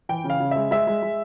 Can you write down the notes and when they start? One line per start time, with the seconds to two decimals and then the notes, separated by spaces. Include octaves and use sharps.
0.09 E3 G5
0.24 C#3
0.30 F5
0.40 C#3
0.51 G#3 E5
0.71 G#3 E5
0.87 G#3
1.02 G#3